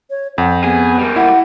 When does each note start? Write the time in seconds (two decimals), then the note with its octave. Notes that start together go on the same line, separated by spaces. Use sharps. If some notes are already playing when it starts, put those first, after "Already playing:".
0.10 C#5
0.38 F2 F#5
0.64 B3 G#4
0.99 G3 A#3
1.16 E4 F#5